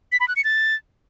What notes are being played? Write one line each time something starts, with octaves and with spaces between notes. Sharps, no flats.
B6
B5
F#6
C#7
A6